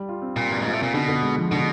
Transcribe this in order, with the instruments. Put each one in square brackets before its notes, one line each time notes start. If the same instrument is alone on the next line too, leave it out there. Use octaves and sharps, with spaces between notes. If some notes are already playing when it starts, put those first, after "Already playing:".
Already playing: [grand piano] G3
F4
C4
[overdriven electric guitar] A#2 [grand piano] G3
[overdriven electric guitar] G2 [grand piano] G3
[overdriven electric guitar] G#2 [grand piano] F4
[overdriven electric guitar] A2
[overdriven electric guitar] A#2 [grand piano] C4
[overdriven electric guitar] B2 [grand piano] D3
[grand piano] D3
G#3
F3
[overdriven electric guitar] B2 [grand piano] D3